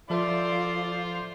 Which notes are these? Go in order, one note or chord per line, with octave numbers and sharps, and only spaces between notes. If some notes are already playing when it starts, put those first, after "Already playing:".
F3 F4 A4 C5 D5 E5 F5 C6